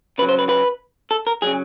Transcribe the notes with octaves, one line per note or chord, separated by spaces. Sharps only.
C#3 F#3 B4
C5
B4
B4
A4
A#4
C#3 F#3 G#4